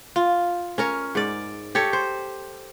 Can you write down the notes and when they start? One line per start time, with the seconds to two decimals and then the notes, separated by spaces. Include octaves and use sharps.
0.16 F4
0.78 C#4 A#4 C#5
1.15 G#2 D5
1.75 G4 A4 C#5
1.93 C5